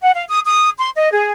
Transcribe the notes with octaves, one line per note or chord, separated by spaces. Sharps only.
F#5
F5
D#6
D#6
C6
D#5
G#4